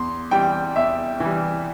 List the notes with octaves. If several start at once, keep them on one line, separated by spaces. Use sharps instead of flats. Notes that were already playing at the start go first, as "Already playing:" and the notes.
Already playing: E2 C6
E3 G3 G5
E2 E5
E3 G3